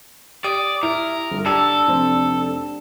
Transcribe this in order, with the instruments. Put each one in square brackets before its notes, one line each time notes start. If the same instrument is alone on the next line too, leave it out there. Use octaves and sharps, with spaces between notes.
[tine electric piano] G4 D#6 [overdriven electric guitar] D5
[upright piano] E4 [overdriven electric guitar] A#4
[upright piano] G1
[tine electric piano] D4 G4 [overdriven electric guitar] A4 [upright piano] E6
[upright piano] F1 C4